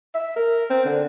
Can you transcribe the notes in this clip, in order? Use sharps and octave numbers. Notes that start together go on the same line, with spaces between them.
E5
A#4
C4
D3